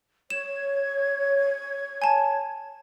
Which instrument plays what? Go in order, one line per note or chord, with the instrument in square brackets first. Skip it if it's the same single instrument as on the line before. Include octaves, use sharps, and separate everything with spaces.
[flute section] C#5 G#6 [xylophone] E7
[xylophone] G#5 A5